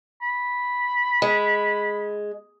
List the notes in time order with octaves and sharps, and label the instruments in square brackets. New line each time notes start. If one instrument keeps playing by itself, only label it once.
[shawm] B5
[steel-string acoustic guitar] G#3